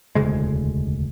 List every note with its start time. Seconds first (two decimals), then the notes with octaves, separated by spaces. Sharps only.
0.15 E1 D2 C#3 G#3